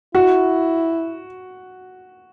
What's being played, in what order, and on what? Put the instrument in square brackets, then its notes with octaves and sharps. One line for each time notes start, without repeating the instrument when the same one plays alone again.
[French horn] E4 [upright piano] F#4